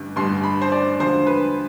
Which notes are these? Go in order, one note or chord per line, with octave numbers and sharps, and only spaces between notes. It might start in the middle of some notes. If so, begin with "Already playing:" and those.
Already playing: A1 G2 D3
A1 G2 D3 C6
B5
C5
D5
E1 D2 D3 F3 C5
B4